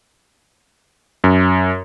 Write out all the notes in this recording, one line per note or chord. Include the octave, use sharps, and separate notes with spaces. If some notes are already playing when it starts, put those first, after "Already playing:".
F#2